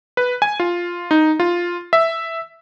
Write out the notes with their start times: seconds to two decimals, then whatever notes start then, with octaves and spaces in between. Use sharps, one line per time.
0.17 B4
0.42 G#5
0.60 F4
1.11 D#4
1.40 F4
1.93 E5